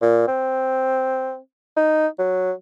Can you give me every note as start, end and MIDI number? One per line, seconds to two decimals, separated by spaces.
0.02 0.23 46
0.28 1.38 60
1.77 2.07 63
2.19 2.52 54